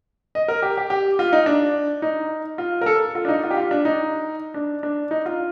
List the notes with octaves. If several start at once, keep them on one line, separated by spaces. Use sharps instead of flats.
D#5
A#4
G4
G4
G4
F4
D#4
D4
D#4
F4
A#4
A4
F4
D4
D#4
F4
G4
F4
D4
D#4
D4
D4
D#4
F4